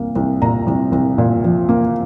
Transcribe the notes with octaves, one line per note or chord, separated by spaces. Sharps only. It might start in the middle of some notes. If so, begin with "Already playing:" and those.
Already playing: C2 A#3
C2
A#2 A#5
C2
C2
A#2
F3
A#3